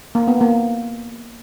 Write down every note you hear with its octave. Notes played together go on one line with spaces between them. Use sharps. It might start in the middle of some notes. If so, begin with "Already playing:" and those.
A#3
B3
A#3